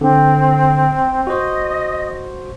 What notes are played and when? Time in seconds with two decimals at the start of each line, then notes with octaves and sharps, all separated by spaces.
0.01 D3 C4
1.27 F#4 C5 D#5